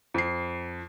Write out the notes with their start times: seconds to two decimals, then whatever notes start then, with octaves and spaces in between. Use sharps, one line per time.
0.14 F2 C7